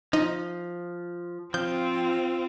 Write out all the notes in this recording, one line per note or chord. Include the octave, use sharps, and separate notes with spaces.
F3 D#4
F3 C4 F4 G6